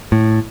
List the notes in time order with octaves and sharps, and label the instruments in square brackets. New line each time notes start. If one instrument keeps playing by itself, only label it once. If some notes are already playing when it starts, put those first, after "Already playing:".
[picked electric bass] A2